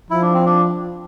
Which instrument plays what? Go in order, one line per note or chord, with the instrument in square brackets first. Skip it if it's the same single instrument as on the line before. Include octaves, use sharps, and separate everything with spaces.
[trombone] F3 [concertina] E4
[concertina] D4
C4
D4